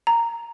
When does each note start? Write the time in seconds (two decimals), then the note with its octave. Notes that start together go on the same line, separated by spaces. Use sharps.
0.07 A#5